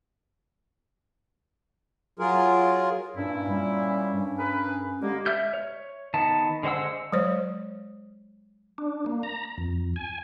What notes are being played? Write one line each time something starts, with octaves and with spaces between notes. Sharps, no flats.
F#3 F4 G#4 A#4
G2 A#2 C#4 E4
G3
G2
G#4 A#4 B4
D3 G#3 A#3 G4
E5 F6 G6
C#5
D#3 B3 A5
D3 G#3 C5 F#5 E6
F#3 G#3 C5 C#5
D4
A#3
A#5
F2
G#5